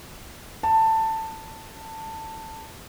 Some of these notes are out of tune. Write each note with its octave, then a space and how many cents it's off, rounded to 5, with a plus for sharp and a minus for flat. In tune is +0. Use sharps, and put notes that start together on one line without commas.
A5 +15